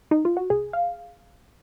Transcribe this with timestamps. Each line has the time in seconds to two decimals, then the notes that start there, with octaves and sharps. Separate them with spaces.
0.11 D#4
0.25 F4
0.37 F#4
0.50 C2 G#4
0.73 F5